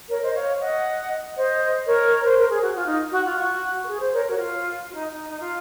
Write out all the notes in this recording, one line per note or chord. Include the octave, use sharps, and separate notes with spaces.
A#4 C#5
C5 D#5
C#5 F5
D#5 F#5
C5 D#5
A#4 C#5
C5
A#4
G#4
F#4
F4
D#4
F#4
F4
F#4
A#4
G#4
C5
A#4 C#5
A#4 C#5
F#4
F4
F4
D#4
D#4
D#4
F4